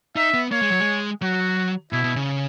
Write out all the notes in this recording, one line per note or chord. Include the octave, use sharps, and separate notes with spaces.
D#4 E5
B3
A#3 C#5
G#3
F#3
G#3
F#3 F#4
B2 E4
B2
C#3